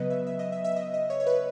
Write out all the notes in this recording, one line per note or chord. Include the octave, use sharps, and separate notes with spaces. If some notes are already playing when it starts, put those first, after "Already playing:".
Already playing: C#3 F#3 B3 B4 D#5
E5
E5
D#5
E5
E5
D#5
D#5
C#5
C#5
B4